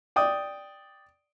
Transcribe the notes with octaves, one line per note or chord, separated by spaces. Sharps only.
D5 G5 D#6